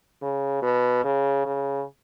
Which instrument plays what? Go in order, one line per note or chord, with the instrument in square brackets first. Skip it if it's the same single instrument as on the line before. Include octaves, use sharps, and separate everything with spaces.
[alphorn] C#3
B2
C#3
C#3